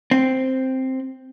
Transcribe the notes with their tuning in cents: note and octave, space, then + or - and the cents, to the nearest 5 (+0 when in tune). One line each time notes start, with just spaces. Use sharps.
C4 +0